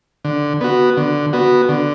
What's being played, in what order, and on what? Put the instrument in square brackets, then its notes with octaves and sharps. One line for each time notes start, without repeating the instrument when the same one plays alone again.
[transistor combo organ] D3
B3 F#4
D3
B3 F#4
D3